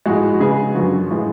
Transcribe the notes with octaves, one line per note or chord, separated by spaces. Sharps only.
A2 F3 G#3 F#4
F#4
C#3 G#3 B3 G#4
F#2 D3 F3 F#4
A2 F3 G#3 B3